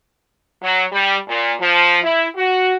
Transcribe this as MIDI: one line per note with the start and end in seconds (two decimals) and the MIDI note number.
0.63 0.84 54
0.92 1.16 55
1.29 1.53 46
1.61 1.99 53
2.03 2.26 64
2.37 2.76 66